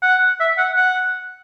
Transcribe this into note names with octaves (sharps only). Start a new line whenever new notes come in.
F#5
E5
F#5
F#5